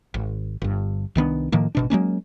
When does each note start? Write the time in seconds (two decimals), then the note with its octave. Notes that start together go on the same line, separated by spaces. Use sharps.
0.14 G#1
0.62 G1 G2
1.15 C2 D#3 B3 D4
1.52 A2 D#3 F3 A#3
1.75 G#1 B2 D4
1.90 F#3 G#3 A#3 C#4